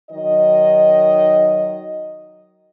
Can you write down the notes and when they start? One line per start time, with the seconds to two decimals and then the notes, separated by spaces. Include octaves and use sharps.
0.11 D#3 F#3 D#5